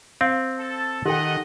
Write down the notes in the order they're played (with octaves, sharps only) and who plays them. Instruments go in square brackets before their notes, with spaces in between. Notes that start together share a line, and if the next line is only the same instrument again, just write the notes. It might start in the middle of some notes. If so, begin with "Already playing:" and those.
[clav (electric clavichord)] C4 [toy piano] F5
[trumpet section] A4
[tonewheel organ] D#3 F#5 [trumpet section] A3 D#5 [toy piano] G4 A4 G5